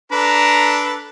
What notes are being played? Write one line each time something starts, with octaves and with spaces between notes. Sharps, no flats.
D4 A4 B4 A#5